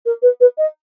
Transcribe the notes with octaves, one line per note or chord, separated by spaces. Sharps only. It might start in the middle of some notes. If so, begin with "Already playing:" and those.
A#4
B4
B4
D#5